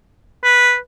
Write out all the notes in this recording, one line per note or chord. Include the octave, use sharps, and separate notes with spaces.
B4